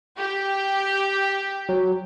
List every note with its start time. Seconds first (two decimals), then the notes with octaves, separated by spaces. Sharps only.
0.17 G4
1.69 F#3